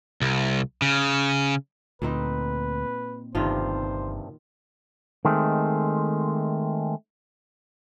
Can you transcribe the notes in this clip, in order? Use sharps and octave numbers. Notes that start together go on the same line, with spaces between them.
C2
C#3
D2 A#2 C4 D#4 B4
G1 G2 C3 D#3 F3 F4 C5
D#3 G#3 A3 C4